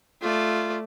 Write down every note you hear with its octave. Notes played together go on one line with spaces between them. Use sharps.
A3 F4 D5